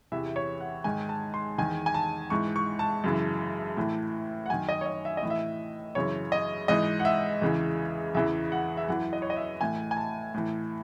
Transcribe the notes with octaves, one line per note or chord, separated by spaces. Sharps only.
E2 C3 E3 E5
C#5
F#5
G#2 D#3 G#5
A5
C6
E2 D#3 G#5
G#5
A5
G#2 E3 C#6
C#6
A5
F#2 C#3 E3
A2 E3
F#5
F#2 D#3 G#5
D#5
C#5
D#5
E5
D#5
A2 E3
E5
F#2 C#3 E3 C#5
D#5
G#2 E3 D#5
F#5
E5
E2 C#3 E3
E2 C#3 E3 E5
F#5
E5
F#2 E3 F#5
D#5
C#5
D#5
E5
A2 E3 G#5
G#5
A5
A2 E3